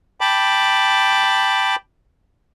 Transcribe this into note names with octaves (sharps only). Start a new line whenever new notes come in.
G5 A5 B5 D6